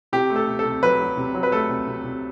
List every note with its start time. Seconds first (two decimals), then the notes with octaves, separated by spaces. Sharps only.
0.13 C3 G4
0.30 A3
0.36 A4
0.48 C3
0.59 A4
0.65 C3
0.83 F#3 B4
1.00 F#3
1.17 C3
1.35 F#3
1.43 B4
1.52 A3 A4
1.70 C3
1.87 C3
2.04 C3